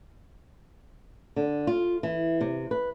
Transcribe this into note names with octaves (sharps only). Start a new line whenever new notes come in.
D3
F4
E3
C3
B4